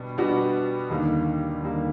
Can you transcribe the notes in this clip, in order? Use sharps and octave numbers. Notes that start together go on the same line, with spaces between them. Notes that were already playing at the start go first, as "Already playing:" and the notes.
Already playing: B2 G3 B3 D4
B2 G3 B3 D4 F#4
D#2 D3 G3 A#3 D#4
D#2 D3 G3 A#3 D#4